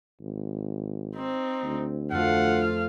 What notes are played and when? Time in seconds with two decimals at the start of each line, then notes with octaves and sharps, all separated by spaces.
0.21 G#1
1.15 C4 D#4
1.64 D2
2.11 F2 A3 F4 F5 F#5